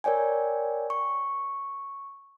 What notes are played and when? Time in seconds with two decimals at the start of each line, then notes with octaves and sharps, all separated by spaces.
0.04 A#4 C#5 D5 G5 G#5
0.90 C#6